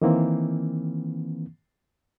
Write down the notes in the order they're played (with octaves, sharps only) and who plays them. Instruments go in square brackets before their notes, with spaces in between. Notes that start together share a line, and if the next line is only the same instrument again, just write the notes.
[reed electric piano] D#3 E3 A#3 C4